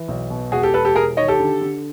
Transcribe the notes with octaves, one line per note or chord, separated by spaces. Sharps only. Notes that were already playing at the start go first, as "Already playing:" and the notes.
Already playing: E3
B1
B2
E1 F#4 G#4
G4 A4
E1 A4 B4
G4 A4
E1 G#4 A#4
D#3 C#5 D#5
G4 A4
D3
D3